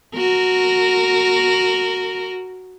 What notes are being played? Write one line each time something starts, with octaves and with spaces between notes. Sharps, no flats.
F#4 A#4